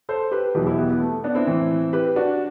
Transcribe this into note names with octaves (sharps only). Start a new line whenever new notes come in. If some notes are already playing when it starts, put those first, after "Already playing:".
A4 C5
G4 B4
E2 B2 F#3 E4 G4
E4 G4
B3
B3
A3
B3 D4
C4 E4
A2 E3
G4 B4
D4 F#4